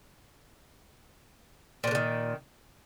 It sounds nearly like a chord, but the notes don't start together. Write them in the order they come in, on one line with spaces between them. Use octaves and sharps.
A#2 F3 D3 D#3